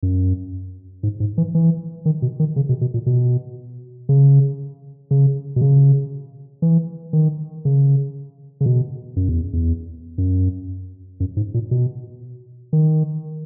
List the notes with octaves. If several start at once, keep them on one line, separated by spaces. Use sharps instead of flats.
F#2
G#2
G#2
E3
E3
D#3
B2
D#3
C#3
B2
B2
A#2
B2
C#3
C#3
B2
C#3
E3
D#3
C#3
C#3
B2
F#2
E2
E2
F#2
F#2
G#2
A#2
B2
D#3